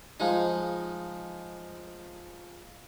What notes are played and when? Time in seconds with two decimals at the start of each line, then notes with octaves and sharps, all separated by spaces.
0.20 F3 G#3 D#4